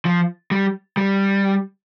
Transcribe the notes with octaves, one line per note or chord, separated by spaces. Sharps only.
F3
G3
G3